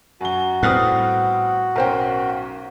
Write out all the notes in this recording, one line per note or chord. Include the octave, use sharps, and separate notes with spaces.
F#2 F#4 G7
A2 G3 B3 C4 D#6 F6 F#6
B1 C#4 A#4 C5 G5